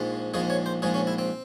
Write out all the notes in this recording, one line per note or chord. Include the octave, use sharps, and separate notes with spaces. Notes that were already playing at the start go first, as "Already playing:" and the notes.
Already playing: A#1 G#2 F3 G#3
A#1 G#2 F3 G#3 G#4
C#5
C5
A#1 G#2 F3 G#3 G#4
C#4
E4
C4